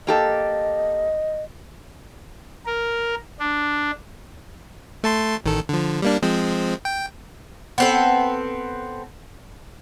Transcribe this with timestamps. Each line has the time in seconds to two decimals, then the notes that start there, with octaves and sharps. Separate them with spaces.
0.07 A#3 G4 A4 D#5
2.66 A#4
3.40 D4
5.04 A3 A5 C6
5.44 A1 D#3 A4
5.69 D3 F3
6.02 G3 A#3 D4
6.22 F3 G#3 C4
6.85 G5
7.78 B3 C4 A4